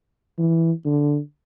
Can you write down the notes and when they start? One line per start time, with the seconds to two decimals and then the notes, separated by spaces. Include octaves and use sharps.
0.39 E3
0.85 D3